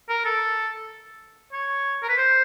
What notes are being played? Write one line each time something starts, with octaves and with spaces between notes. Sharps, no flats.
A#4
A4
C#5
A#4
B4
C5